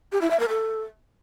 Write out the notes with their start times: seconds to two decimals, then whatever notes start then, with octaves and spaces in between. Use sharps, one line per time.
0.12 G4
0.21 E4
0.31 E5
0.40 A#4
0.49 A4